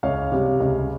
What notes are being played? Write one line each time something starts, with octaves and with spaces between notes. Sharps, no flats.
C#2 C#5 F5
C3 G3
C#2